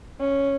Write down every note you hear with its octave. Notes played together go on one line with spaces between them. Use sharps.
C#4